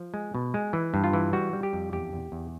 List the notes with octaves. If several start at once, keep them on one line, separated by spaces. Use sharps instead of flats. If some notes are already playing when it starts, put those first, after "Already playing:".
Already playing: F3
G#3
B2
G#3
E3
G2
F4
E3
G3 F#4
G3
G4
F2
E2 G4
E2
E2